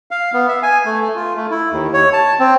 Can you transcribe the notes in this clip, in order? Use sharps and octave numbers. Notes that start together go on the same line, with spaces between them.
F5
B3
E5
G#5
A3
F4
A3
E4
D#2
C#5
A5
C4